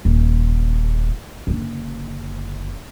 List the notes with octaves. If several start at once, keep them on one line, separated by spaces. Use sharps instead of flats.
D#1
F#1 D3